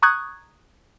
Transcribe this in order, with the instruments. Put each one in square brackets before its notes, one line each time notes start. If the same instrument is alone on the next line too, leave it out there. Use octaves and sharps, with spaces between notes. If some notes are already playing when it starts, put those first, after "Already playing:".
[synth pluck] A#5 C#6 D#6 F#6 G#6